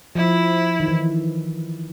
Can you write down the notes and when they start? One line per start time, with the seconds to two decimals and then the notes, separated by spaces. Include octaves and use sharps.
0.15 F3 E4
0.80 D#3
0.88 E3